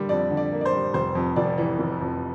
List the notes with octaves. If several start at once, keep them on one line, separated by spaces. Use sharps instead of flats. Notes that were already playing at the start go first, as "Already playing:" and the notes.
Already playing: D3 G3 A#3
F2 D5
D3
D5
A#3
D5
C5
G3
F1 C5
F2
F1 D5
E3
F1
F2